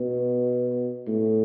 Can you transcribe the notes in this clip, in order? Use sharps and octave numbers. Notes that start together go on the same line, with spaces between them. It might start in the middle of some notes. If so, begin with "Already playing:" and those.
Already playing: B2
A2